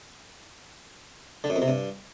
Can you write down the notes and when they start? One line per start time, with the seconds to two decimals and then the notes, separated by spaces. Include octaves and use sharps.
1.44 D3
1.50 F#2
1.56 F2
1.62 C3
1.68 G2